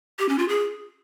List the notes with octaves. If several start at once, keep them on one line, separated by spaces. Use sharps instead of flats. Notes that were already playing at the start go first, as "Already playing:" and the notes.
G4
C#4
F4
G#4